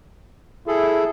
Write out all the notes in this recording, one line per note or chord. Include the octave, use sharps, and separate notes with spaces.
E4 G#4 A4